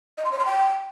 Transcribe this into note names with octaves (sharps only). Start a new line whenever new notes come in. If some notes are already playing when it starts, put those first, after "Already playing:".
D#5
C6
C#5
C6
G5